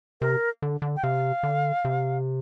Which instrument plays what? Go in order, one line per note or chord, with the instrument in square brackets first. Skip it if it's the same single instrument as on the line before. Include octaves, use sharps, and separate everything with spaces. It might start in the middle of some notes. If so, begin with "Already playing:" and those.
[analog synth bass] C3 [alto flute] A#4
[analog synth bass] D3
D3
[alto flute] G5
[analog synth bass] C3 [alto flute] F5
[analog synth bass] D3
C3